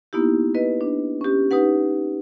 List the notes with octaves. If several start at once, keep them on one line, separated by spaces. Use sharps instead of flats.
A#3 B3 D#4 E4 G4
B4 D#5
D4
C#4 G4
D#4 G4 B4 F#5